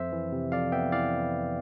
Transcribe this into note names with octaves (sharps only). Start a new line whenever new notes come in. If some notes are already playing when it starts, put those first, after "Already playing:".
Already playing: F2 C5 E5
E3
C3
F2 D5 F5
B3 E5 G5
E3 D5 F5